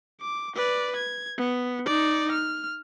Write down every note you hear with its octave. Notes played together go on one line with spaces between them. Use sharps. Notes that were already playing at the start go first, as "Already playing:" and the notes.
D6
B4 D5
G#6
B3
D#4 D5
F6